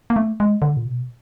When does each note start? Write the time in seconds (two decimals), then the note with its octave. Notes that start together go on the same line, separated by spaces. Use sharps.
0.10 A#3
0.16 A3
0.40 G#3
0.62 D3
0.77 A#2
0.86 B2